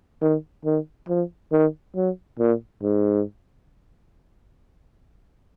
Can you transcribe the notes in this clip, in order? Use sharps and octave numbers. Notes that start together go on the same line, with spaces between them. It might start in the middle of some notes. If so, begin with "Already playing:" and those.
D#3
D#3
F3
D#3
F#3
A#2
G#2